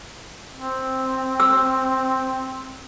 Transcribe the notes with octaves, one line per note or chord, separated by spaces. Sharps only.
C4
E6